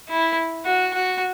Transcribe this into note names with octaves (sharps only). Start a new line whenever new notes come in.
E4
F#4
F#4